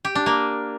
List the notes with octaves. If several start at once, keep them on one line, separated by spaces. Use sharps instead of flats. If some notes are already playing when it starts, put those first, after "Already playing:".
G4
D4
A#3